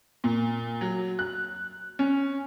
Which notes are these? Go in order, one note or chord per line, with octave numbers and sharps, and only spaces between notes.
A#2
F#3
F#6
C#4